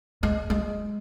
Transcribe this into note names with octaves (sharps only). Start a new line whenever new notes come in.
G#3
G#3